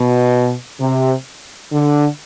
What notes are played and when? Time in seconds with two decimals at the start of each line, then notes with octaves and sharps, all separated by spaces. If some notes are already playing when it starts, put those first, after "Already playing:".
Already playing: B2
0.80 C3
1.73 D3